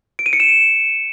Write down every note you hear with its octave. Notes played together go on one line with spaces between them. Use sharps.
D7
D#7
C#7
E7